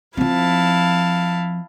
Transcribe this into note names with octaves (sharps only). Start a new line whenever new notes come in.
F3 C4 E4 F5 A5